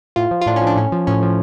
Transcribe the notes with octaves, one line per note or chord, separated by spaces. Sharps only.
A2 F4
F3
F4
A2 D4
C#4
F3
D4
A2 C#4
F3
A2 C#4
F3